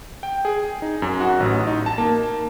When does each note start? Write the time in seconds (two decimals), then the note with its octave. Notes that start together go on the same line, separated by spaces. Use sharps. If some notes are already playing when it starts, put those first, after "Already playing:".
0.23 G5
0.45 G#4
0.82 D#4
1.02 F#2
1.21 F#4
1.40 A1
1.67 D#4
1.86 A5
1.98 A#3